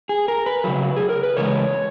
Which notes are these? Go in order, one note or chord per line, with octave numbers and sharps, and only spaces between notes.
G#4
A#4
B4
C#3 F#3
G#4
A#4
B4
C#3 E3 G#3 C#5